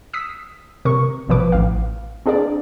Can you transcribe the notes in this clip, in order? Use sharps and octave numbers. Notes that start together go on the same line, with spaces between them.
D#6 E6 B6
C3 A#4 C#6
A1 B2 F3 B4 D6
A1 F5
C4 D4 G#4 A#4 D5